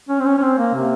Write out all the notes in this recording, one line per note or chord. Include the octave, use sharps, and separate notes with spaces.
C#4
C4
C#4
C#4
C4
A#3
C3